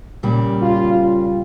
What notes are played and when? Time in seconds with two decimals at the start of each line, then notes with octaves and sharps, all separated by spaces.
0.23 A#2 C#3 G3
0.62 F4
0.94 F4